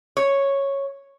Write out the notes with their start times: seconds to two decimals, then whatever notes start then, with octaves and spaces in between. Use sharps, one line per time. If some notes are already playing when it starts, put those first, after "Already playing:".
0.17 C#5